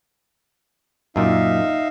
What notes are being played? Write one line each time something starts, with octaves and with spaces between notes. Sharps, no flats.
F#2 A#2 D#4 E5 F5